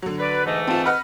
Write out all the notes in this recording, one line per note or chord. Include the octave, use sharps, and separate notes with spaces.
D3 F#3
B4 D5
G#2 E3 A3 D#5
C4 F4 A5
B4 D#5 F#5 F6